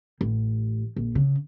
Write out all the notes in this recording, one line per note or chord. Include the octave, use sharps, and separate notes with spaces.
A1
A#1
C#3